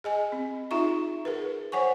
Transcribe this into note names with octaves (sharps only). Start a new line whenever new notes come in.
G#4 D#5 G#5
C4
D#4 F4 G#4 E5 A#5 C#6
G#4 A#4 B4
C5 C#5 F#5 G#5 C#6